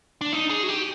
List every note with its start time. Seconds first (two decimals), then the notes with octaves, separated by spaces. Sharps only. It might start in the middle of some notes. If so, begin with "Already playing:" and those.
0.21 D4
0.33 D#4
0.50 G#4
0.63 F#4
0.69 G4